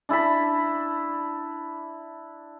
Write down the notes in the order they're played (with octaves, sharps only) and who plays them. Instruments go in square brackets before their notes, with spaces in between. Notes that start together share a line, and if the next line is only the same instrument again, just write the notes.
[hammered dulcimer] D4 E4 A5 B5